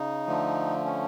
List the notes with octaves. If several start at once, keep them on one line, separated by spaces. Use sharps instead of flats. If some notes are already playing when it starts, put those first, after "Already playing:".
Already playing: C#3 D#4
D3 F3 A3
C#4